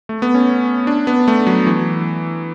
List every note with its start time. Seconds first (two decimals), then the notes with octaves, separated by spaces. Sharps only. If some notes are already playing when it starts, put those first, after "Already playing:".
0.09 A3
0.22 B3
0.34 C#4
0.87 D4
1.07 B3
1.28 A3
1.47 F#3
1.67 E3